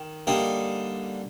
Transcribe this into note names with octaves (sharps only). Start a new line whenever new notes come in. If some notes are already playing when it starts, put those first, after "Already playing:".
Already playing: D#3
D3 G3 A#3 D#4